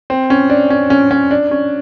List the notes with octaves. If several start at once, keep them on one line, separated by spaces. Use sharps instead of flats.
C4
C#4
D4
C#4
C#4
C#4
D4
C#4